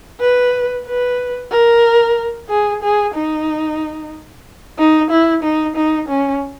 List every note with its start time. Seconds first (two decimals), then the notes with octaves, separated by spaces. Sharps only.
0.20 B4
0.86 B4
1.51 A#4
2.49 G#4
2.83 G#4
3.15 D#4
4.79 D#4
5.10 E4
5.43 D#4
5.76 D#4
6.08 C#4